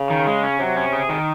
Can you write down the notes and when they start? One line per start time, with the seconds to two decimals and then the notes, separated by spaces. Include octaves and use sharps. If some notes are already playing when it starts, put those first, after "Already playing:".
Already playing: C#3
0.10 D#3
0.27 G#3
0.44 C#4
0.60 C3 F#3
0.77 C#4
0.93 G#4
1.09 D#3